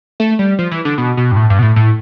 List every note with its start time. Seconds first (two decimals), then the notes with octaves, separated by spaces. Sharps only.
0.20 A3
0.39 G3
0.59 F3
0.71 E3
0.85 D3
0.98 B2
1.17 B2
1.32 G2
1.36 A2
1.50 G2
1.59 B2
1.62 A2
1.76 A2